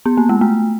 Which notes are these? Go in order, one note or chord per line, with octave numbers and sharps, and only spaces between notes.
B3
A#3
G#3
A3